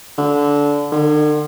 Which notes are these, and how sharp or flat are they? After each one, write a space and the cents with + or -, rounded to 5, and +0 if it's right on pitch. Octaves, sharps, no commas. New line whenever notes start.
D3 -20
D3 +45